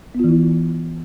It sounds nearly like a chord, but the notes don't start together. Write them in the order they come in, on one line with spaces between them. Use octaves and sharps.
B3 F4 E3 E4